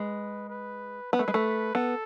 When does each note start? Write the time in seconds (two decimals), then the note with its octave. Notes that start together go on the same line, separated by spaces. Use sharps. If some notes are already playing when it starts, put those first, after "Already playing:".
Already playing: G#3 B4
0.50 B4
1.13 B3 B4
1.19 A3
1.28 G#3
1.34 A3
1.75 B3 A4